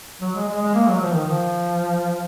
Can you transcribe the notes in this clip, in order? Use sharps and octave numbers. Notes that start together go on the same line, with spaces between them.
F#3
G#3
G#3
G#3
A#3
F#3
F3
D#3
F3